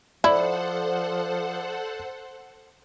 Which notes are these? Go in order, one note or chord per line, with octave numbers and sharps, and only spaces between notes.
F3 E4 A4 C5 D5 F#5